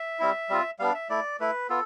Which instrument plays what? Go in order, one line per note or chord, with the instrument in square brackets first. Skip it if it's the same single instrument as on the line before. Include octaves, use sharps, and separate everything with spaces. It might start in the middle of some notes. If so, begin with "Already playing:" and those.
Already playing: [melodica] E5
G3 C4 E4
G3 C4 F4
G3 B3 D4 F5
E5
A3 E4 D5
A3 E4 B4
B3 F4 A4